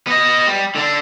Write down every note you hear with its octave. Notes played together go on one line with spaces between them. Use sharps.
B3 D#5
G3
D3 D4